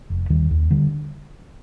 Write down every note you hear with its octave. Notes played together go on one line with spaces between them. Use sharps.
F1
D#2 D#3 G3
D#2
D3 G3